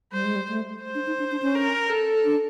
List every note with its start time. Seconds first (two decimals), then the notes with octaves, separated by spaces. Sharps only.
0.12 G3 C5
0.25 G#3
0.36 G3
0.49 A3
0.83 C5
0.95 D4
1.07 D#4
1.19 D4
1.31 D4
1.42 C#4
1.55 A#4
1.89 A4
2.25 D4